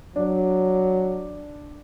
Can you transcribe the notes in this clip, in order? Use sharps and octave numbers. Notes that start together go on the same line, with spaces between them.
F#3 D4